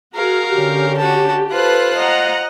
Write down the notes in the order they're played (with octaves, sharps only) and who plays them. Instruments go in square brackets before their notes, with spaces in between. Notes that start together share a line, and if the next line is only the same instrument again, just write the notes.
[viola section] F#4 G#4 [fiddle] A#4 F5
[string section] D3 C#4 [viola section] G4
[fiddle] F#4 A5
[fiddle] F4 C5 [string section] A4 B4 F#6
[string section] D#5 [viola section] F#5 A#5